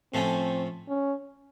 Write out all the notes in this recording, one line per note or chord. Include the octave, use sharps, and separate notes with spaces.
A2 F3 A3 C4 C#4
C#4